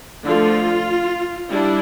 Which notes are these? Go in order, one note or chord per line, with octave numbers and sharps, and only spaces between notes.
D3 F3 A3 F4
G3 D4 E4